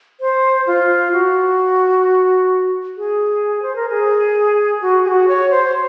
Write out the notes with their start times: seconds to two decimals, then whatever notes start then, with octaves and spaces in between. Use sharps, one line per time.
0.20 C5
0.67 F4
1.12 F#4
2.97 G#4
3.62 C5
3.76 A#4
3.89 G#4
4.82 F#4
5.04 G#4
5.08 F#4
5.28 C#5
5.51 C5